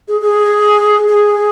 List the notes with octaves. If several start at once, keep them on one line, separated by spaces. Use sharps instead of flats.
G#4
G#4
G#4